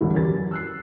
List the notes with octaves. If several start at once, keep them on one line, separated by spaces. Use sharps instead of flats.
A1 D2 G2 E4
E2 C#4 G4 A#4 A6
F#2
E6 F#6 C7